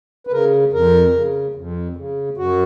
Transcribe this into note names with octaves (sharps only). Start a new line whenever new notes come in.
B4
C#3 A#4
F2 A#4
C#3
F2
C#3
F#2 F#4